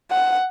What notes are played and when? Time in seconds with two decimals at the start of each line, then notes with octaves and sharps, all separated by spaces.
0.11 F#5